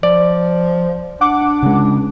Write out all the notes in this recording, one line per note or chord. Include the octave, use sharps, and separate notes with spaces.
F3 D5
D4 F#5 D6
C#3 G#3